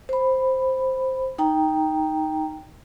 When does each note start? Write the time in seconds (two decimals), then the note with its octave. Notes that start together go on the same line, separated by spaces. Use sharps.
0.09 C5 B5
1.38 D#4 G5 A#5